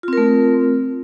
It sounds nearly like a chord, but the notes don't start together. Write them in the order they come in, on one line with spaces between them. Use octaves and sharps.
F4 C4 A#4 A3